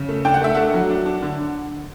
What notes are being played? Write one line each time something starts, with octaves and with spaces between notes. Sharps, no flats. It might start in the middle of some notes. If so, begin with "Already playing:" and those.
Already playing: C#3
A3
D4 G5
F#5
A3 E5
A3 F#5
F#3
D4
D4
D3